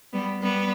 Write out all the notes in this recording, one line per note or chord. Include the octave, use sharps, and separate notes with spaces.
G3 B3
G3 B3